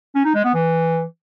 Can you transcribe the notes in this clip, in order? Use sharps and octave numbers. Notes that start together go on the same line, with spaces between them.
C#4
D#4
G#3
B3
E3